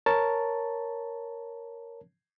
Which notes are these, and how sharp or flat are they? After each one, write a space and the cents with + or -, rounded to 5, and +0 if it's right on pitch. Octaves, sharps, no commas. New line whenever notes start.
A#4 +0 C#5 +0 A5 +0